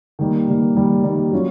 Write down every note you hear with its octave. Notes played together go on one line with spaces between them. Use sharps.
D#3 G3 A#3
D#3 G3 A#3
D#3 G3 A#3
D#3 G3 A#3
F#3 A#3 C#4 F4